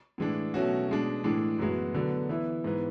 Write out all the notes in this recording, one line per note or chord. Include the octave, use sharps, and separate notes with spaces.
A2 E3 G#3 D4
B2 F#3 A3 C#4 F#4
B2 G#3 D4
A2 E3 G#3 D4
F#2 E3 G#3 B3 F#4
D3 F#3 B3
E3 B3 E4
G#2 E3 B3